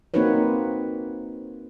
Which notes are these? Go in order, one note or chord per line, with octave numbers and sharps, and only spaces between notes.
A#3 C4 D#4 F#4 B4 C#5